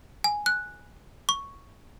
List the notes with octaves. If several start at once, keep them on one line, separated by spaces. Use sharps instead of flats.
G#5
F#6
C#6